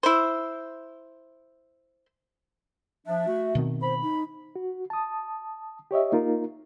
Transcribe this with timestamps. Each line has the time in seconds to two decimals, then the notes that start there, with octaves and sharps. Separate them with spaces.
0.03 E4 C5
3.07 F3 D4 E5
3.27 A3 F#4
3.55 B2 D#3 C4
3.82 C5 B5
4.03 D#4
4.56 F#4
4.90 A5 D#6
5.91 G4 C#5 D#5 E5
6.12 A#3 D#4 F4 A#4